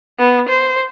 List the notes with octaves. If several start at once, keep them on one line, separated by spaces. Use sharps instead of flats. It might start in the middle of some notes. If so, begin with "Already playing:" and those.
B3
C5